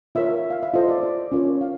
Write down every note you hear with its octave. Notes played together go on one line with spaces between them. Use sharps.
F4 A#4 C#5 E5
F5
E5
F4 A4 C5 D#5
D5
D5
C#4 F4 A#4 C#5
F5